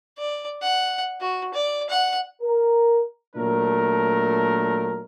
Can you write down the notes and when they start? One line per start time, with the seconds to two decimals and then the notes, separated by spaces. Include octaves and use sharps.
0.18 D5
0.63 F#5
1.21 F#4
1.54 D5
1.90 F#5
2.42 A#4
3.35 A#2 F#3 A3 D4 A#4